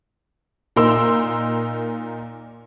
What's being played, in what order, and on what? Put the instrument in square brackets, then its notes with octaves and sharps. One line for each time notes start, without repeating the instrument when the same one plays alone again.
[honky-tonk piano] A#2 D#4 A#4 C6 E6